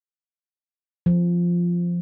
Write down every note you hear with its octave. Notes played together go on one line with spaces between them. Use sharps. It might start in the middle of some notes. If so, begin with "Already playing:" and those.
F3